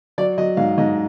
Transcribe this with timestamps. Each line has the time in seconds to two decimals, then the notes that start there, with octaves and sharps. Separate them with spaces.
0.18 F#3 D5
0.38 F#3 D#5
0.57 G#2 F5
0.78 G#2 D#5